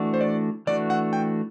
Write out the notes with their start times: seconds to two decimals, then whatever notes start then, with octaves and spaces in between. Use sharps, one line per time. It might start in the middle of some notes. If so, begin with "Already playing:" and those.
Already playing: E3 A3 D4 F#4
0.14 C5
0.21 D5
0.67 E3 A3 D4 F#4 D5
0.90 F#5
1.13 G5